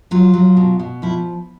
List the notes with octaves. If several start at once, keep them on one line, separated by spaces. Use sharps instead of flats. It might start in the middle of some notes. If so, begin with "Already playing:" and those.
F#3 F4
F#3
B2
B2
F3 E4